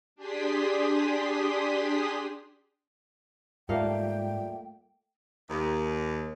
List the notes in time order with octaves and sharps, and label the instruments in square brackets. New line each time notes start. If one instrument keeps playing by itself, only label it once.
[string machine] D4 G4 G#4 C6 D#6 B6
[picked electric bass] G#2 [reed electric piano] G3 F4 D5 [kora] A3 A#3 F5 [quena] G5
[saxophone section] D#2